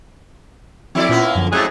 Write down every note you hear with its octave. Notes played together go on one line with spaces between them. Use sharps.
F3 C4 E4 A4 D5
A#2 A#3 B3 C#4 F4
F5
F#2 D3 F3
F2 G#2 F#3 A3 G#4 F#6 A6